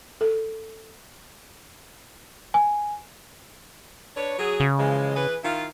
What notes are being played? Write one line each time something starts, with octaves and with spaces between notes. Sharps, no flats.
A4
G#5
D4 B4 C#5
F#3 G#4
C#3
E3 F3 G#3
E3 G#4 B4
D#3 E4 F4